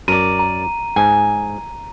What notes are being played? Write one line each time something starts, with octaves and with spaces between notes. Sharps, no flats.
F#2 A#4 D5 D#7
A#5
G#2 G#5